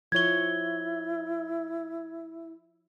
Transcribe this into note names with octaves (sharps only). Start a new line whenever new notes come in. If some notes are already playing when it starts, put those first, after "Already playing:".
F3 E4 C#5 G#6 G7